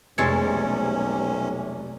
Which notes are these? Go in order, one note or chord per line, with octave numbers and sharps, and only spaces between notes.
F1 B1 C3 G#3 C#4 A4 C#5